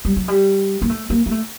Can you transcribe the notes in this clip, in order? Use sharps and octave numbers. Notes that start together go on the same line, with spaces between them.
G3
F#3
G3
A#3
A3
A#3
A#3
A3